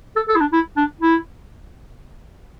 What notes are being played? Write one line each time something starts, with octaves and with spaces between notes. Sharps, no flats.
A4
A4
E4
D4
E4
D4
E4